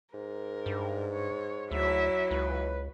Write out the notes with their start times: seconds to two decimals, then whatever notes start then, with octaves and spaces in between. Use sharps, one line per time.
0.14 G#2 A#4
0.66 G2
1.13 C#5
1.71 D2 F#3 E4 E5
2.31 C#2 E3 B4